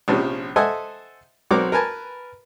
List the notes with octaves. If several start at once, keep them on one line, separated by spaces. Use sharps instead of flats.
A#1 C3 F3 C#4
A4 C5 D#5 E5 F#5 G#5
B1 C4 F#4 A#4 D6
A#4 B4 G#5 A5